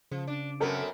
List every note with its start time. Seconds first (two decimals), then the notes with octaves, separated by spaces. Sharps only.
0.12 C#3 F3
0.27 D4
0.60 F#2 B3 C4 A4 A#4